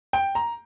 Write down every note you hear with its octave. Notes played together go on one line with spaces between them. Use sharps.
G5
A#5